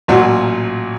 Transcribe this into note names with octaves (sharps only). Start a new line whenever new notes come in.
A1 A#2 F#3 F4 F#4 E6